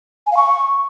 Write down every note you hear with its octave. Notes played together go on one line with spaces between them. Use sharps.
G#5
F5
C#6